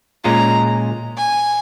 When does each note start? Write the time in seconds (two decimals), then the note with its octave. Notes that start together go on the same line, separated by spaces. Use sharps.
0.24 A#2 G#3 C#4 F4 A#5
1.18 G#5